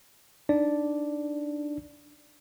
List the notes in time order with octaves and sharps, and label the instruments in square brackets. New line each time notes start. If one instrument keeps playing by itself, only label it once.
[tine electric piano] D4 D#4 D5